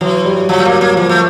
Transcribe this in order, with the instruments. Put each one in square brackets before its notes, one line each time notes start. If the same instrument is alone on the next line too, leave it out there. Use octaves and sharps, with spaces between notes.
[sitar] E3 [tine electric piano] F#3
[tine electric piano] G3
[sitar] F3 [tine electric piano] F#3
[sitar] A3
A#3
A#3
[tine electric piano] F3 [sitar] A#3
[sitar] A3